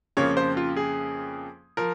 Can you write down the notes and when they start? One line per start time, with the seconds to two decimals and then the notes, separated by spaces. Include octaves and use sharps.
0.17 F2 C#3 F3 A#3 C#5
0.37 C5
0.57 F4
0.77 G#4
1.77 F3 A#4